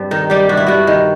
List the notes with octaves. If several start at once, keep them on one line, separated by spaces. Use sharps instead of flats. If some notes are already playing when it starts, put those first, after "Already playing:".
Already playing: G2 G3 C4
D#3 D#4
G3 G4
G2 F#4
E4
G2 F#4
D#3